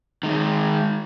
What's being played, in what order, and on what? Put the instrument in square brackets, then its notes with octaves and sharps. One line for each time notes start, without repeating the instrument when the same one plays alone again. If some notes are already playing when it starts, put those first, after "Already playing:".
[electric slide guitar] D#3 G#3